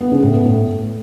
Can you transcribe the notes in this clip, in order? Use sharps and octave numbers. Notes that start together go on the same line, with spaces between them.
B3
C#3
A2
B3
A2